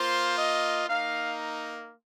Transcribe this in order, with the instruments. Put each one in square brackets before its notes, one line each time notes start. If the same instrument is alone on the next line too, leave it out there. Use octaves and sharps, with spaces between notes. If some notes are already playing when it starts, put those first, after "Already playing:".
Already playing: [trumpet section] A#3 F4 C5
D#5
A#3 D#4 F5